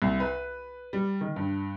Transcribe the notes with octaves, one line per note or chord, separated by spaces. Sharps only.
C2
B4
G3
D#3
G2